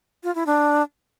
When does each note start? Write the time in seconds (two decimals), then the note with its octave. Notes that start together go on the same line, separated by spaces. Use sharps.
0.24 F4
0.35 E4
0.47 D4